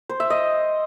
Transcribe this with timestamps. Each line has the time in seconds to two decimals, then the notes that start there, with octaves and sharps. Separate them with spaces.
0.09 C5
0.20 E5
0.30 D#5